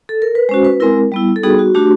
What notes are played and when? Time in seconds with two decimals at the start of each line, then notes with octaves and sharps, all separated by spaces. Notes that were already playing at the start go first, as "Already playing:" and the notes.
0.09 A4
0.22 A#4
0.35 B4
0.49 G#3 C#4 F#4 C5
0.65 B4
0.80 G#3 C4 E4 A#4
1.12 G3 B3 E4
1.36 A4
1.43 G3 B3 D#4 F#4 G#4
1.59 F#4
1.75 A3 D4 F#4 G4